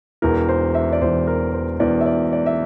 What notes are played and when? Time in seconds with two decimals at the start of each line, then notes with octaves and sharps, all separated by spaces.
0.22 E1 E2 E3 A#4
0.49 C5
0.75 E5
0.93 D5
1.01 E1 E2 E3 C5
1.27 A#4
1.53 C5
1.80 E1 E2 E3 D5
2.01 E5
2.06 D5
2.33 D5
2.46 E5